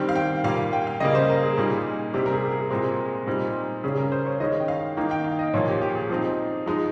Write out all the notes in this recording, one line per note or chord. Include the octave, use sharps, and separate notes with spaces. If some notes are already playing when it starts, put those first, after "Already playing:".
Already playing: D#3 G3 C4 G5
F5
G5
A#2 G3 A#3 F5
G5
F5
C#3 G3 A#3 D#5
C5
A#4
G#4
A#2 G3 A#3 D#4 G#4
C3 G3 C4 G4
A#4
G#4
G#4
A#2 G#3 C4 A#4
A#2 G3 C4 D#4
C#3 G3 C#4 G#4
A#4
C5
C#5
D#3 G#3 C#4 D#5
G5
F5
D#3 A#3 D#4 G5
G5
F5
D#5
A#2 F3 A#3 C#5
G4
G4
G#4
F3 C4 D#4
F3 G#3 D#4